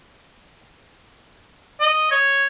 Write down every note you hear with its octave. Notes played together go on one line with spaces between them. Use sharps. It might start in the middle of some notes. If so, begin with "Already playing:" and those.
D#5
C#5